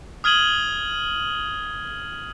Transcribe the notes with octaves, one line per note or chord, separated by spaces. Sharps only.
D#6 F6 G#6 D#7 F#7 G7